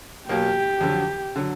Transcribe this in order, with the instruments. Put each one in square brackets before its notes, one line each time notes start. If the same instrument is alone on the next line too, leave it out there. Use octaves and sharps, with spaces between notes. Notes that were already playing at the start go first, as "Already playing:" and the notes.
[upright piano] B2 F#3 A#3 [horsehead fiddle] G4
[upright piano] F2 D3 F#3
D3 F#3